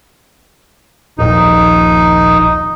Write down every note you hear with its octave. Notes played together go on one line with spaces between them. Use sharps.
D#1 A#1 D#4